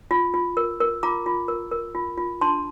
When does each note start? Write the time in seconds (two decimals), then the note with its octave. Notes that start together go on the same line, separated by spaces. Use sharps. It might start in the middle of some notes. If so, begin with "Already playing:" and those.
0.11 F4
0.34 F4
0.57 A#4
0.81 A#4
1.03 F4 A#5 D6
1.26 F4
1.48 A#4
1.71 A#4
1.95 F4
2.18 F4
2.41 D4 A5 C6